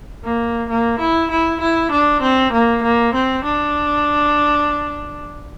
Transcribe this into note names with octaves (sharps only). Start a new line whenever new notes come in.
A#3
A#3
E4
E4
E4
D4
C4
A#3
A#3
C4
D4